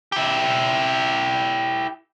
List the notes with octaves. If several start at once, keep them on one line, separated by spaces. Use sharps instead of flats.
E4 G4